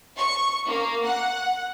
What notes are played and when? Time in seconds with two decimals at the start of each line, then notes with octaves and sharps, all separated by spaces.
0.17 C#6
0.66 A#3
1.05 F#5